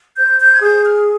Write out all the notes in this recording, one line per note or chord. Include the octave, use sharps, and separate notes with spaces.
C5 G6
G6
G#6
G#4 G6
F6